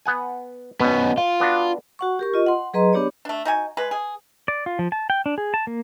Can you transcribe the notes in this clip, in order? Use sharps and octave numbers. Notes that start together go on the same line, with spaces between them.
B3 F#5 G#5
B2 B3 C#4
F4
B3 D4 F#4
F#4 F#5 C#6
G4 A#4 C#6
F4 D#5
F#5 C6
F#3 G#4 B4 D#5 A#5 C6
B3 D4 G4 C#5 D5
A3 D4
D#4 F#4 G#5
G#3 B4
G#4
D5
F4
F3
A5
G5
D4
G#4
A5
A#3